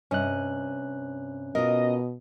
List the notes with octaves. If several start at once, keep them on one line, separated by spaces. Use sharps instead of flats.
G2 C3 C#4 D#5 F#6
B2 F4 A#4 D#5